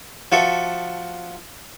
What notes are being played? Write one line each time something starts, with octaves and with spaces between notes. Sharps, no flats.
F3 F#4 A4 E5